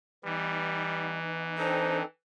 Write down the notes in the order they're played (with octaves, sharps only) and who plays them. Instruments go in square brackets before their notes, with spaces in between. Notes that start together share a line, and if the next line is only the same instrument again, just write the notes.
[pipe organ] E3 [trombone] G3 [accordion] B3 D#4
[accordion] C4 D4 A4 [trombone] D#4 [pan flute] C5